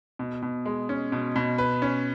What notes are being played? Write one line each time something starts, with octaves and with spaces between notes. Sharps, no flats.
B2
B2
G#3
C#4
B2
B2
B4
C#4